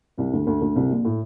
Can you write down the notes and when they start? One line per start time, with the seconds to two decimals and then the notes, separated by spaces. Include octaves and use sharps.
0.17 C2 C3
0.33 D2 D3
0.47 D2 D3
0.62 D2 D3
0.75 C2 C3
0.90 A#1 A#2
1.05 A2